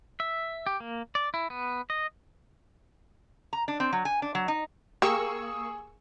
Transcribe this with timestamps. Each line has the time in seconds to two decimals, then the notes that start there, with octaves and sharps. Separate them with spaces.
0.20 E5
0.66 G4
0.80 A#3
1.15 D5
1.34 E4
1.50 B3
1.90 D#5
3.53 A#5
3.68 D4
3.80 C4
3.93 F#3
4.05 G#5
4.22 D4
4.35 F#3
4.48 D#4
5.02 A#3 G4 G#4 C#6 E6